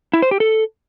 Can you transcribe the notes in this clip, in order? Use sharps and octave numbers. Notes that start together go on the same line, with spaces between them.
E4
C5
G4
A4